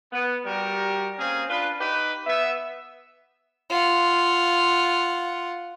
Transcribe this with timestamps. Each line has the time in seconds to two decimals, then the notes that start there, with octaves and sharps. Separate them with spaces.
0.12 B3
0.44 G3 F#4 G4 A#4
1.18 A#3 C4 C#4 G#4
1.48 D4 F4 B4
1.80 D#4 G4 B4
2.26 B3 E5
3.70 F4 F#5